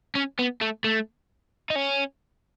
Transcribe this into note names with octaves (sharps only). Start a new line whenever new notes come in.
C#4
B3
A3
A3
D#4
C#4